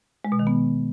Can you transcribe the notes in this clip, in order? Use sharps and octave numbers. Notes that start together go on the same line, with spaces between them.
G#3
B2
D#3
B3